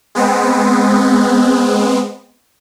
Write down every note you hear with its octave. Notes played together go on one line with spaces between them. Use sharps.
G#3 B3 C4